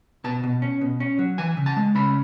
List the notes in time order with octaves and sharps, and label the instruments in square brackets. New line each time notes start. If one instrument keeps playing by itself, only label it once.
[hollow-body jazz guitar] B2 A5
B2
C#4
B2
C#4
F#3
E3 G#5
C#3
A5
G#3
C#3 B5